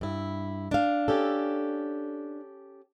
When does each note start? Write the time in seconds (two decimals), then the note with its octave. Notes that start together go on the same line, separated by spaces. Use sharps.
0.01 G2 E4
0.71 D4 F5
1.08 C#4 G4 A4